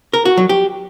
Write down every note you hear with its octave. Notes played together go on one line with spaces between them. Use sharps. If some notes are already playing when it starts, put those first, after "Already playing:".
A#4
F#4
F#3
G4